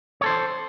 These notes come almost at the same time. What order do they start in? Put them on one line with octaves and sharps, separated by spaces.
C#5 A4 C5